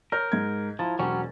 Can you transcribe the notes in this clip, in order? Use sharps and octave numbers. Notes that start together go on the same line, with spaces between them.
A#4 C#5 F6 G6
G#2 G#6
F3 E4 A#5 A6
E1 F#3 G3 C#4 C5 C#6